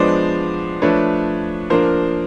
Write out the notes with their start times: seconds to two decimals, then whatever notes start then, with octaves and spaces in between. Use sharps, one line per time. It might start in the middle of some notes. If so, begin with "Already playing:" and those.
Already playing: F3 G#3 B3 D4 C5 D5
0.82 F3 A3 D4 B4 C#5
1.70 F3 A#3 D4 A#4 C5